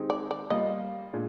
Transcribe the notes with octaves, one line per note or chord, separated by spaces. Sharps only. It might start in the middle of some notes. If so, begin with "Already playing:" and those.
Already playing: D#3 G#3 C4 D#4 G4
D5
D5
G3 A#3 F4 D#5
A#2 G#3 D4